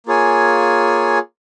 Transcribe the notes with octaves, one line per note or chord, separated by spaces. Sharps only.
A#3 F4 G#4 C#5 G#5